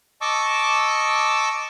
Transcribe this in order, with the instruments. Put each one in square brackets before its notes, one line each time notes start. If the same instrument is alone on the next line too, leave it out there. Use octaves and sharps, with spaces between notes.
[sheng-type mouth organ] D#5 A5 C#6 D6 E6